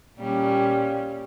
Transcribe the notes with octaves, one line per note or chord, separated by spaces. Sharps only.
A#2 G3 C#4